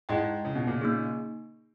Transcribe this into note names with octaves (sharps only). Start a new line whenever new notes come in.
G#2 E4 G#4 D#5 G5
C#3
B2
A#2 C#3
A#3 D#4 G#4